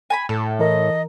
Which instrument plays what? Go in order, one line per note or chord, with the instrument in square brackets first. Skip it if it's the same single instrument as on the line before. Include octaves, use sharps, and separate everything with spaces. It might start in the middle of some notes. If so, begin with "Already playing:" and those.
[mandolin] G#5 A#5 B5
[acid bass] A2 [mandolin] A4
[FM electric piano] E3 A#4 [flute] D#5